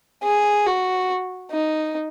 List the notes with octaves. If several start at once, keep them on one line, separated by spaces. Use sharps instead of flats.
G#4
F#4
D#4